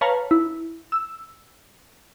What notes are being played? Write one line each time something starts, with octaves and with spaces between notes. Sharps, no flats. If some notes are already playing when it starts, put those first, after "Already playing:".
B4 C#5 F5 A5 A#5
E4
E6